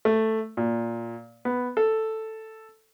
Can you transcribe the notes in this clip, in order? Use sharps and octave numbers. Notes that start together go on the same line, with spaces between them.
A3
A#2
B3
A4